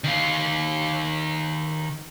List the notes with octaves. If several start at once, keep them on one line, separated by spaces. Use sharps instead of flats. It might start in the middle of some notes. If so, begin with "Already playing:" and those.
D#3 F5